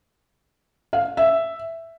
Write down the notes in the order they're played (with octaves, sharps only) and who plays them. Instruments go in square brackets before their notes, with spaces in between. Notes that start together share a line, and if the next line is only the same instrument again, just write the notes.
[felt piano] F5
E5